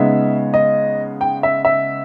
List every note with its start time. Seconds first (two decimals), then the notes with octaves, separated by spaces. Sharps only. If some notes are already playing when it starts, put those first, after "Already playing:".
Already playing: C#3 G#3 B3 D#4 E5
0.54 D#5
1.21 G5
1.43 E5
1.65 E5